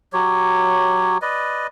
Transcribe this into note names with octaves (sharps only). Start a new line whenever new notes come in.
F#3 G4 C#5
B4 D5 D#5